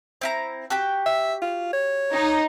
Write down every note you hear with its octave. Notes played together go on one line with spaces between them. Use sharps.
C4 E4 A#5
F#4 G4 G5
E5
F4
C#5
D#4